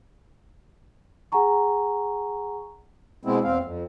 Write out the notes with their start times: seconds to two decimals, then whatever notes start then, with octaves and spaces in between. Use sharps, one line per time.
1.32 G#4 F#5 G#5 A#5 C#6
3.25 B2 G#3 B3 C4 E4
3.44 E2 C4 F5
3.63 F2